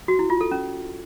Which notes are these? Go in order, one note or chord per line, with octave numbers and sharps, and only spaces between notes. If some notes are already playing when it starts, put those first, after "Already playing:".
F#4
E4
F4
A4
C#4